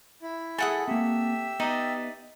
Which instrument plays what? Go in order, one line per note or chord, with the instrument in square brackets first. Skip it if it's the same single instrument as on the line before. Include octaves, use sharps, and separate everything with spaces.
[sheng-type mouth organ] E4
[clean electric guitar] G#4 E5 G#5 [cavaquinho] A4 F#5 D#6
[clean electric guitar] A#3 C4 [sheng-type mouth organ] G4 E5
[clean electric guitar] B3 [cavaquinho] D#4 D5 D#5